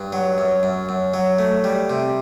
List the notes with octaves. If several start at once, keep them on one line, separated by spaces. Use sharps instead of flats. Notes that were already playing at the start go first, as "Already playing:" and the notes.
Already playing: G2
F#3
F#2
F#2
F#2
F#3
A3
G3
C3